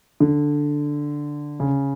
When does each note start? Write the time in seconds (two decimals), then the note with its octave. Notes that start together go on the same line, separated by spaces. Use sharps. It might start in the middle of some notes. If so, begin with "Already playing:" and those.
0.20 D3
1.60 C#3